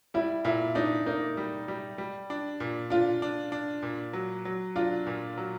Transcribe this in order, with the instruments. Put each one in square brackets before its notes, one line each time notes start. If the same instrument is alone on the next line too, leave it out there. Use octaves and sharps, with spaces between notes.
[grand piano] G3 [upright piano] E4
[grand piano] A#2 [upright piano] E4
[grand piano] D4 [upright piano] D#4
[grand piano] A#3 [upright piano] D#4
[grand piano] G3
G3
G3
D4
A#2
[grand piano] D4 [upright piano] F4
[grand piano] D4
D4
A#2
F#3
F#3
[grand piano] D4 [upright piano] F4
[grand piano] A#2
F#3